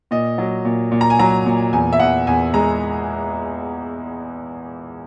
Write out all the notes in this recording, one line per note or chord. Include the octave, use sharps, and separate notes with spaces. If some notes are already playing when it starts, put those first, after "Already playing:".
A#2 D#5
F#3
A#2
A#2
A#5
G#5
F#3 A#5
A#2
E2 G#5
E5
E2 F#5
E2 G#5
G#3 A#5